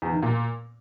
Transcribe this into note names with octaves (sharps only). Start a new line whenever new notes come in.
E2
D#3
A#2